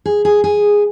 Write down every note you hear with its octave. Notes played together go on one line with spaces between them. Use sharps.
G#4
G#4
G#4